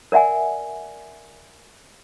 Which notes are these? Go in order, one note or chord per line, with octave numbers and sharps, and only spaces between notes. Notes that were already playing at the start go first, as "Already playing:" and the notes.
A#4 D5 E5 F#5 G#5